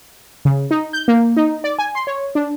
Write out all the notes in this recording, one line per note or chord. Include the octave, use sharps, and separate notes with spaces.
C#3
D#4
G6
A#3
D#4
D5
G#5
C6
C#5
D4